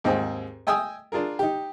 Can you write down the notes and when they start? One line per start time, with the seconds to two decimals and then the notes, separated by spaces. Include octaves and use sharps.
0.04 D#2 G#2 C4 G#4 G5
0.67 D#5 G5 G#5 D#6 E6
1.12 D4 F4 G#4 A#4
1.39 D#4 G4